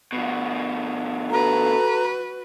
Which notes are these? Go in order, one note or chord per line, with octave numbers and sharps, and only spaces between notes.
B2 F3
F#4 A4 B4 A#5